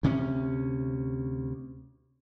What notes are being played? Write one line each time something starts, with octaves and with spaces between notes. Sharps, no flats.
D2 C3 A3 C#4